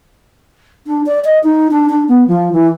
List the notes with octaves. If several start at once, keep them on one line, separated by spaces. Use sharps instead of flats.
D4
D5
D#5
D#4
D4
D4
B3
F3
E3